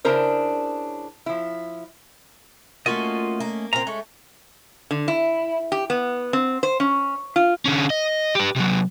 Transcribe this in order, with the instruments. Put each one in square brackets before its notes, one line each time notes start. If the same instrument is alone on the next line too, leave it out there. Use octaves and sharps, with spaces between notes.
[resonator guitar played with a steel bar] C#3 D4 E4 A#4 C5
F3 E4
[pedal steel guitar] A3 C#4 D#5 [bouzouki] A#3 F4 F#4
[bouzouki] A#3
[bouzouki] A#2 C4 [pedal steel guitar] A#5
[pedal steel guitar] G#3 C#5 [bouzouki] A3
[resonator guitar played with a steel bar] D3
E4
G4
B3
C4
C5
C#4
F4
[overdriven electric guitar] D3 C#4
D#5
G4 B4
C3 F#3